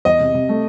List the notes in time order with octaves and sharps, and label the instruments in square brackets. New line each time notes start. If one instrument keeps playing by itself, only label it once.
[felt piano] E2 [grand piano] D#5
[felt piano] C3
C3
A3